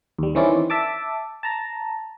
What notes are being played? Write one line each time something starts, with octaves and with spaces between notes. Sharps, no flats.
D#2 G3
D#3 E3 C4 C#4 E4 D5
E5 A5 D6
A5 A#5